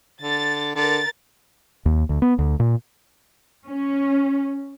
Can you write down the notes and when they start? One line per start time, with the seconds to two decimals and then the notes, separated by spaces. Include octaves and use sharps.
0.22 D3 A6
0.75 D3 A#4 A6
1.85 D#2
2.09 D2
2.22 B3
2.39 D2
2.60 A#2
3.67 C#4